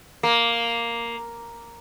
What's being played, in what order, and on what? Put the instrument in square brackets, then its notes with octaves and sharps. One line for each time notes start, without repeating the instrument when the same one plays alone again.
[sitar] A#3